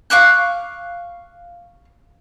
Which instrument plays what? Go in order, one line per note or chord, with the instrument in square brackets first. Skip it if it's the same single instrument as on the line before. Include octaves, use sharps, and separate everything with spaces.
[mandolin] F5 C#6 D6 F#6